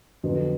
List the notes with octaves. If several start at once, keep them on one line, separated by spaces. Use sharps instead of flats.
F2 D3 F#3 B3